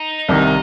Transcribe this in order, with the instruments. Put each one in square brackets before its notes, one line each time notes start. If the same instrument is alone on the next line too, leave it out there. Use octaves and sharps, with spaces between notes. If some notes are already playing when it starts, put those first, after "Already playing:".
Already playing: [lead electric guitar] D#4
[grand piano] C2 C3 D#3